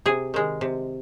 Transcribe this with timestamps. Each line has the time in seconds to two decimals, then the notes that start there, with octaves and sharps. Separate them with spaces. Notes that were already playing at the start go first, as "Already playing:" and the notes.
0.05 C3 G#4
0.34 D#3 G#3
0.61 C3